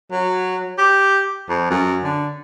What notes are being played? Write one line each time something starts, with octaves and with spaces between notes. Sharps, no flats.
F#3
G4
F2
F#2
D3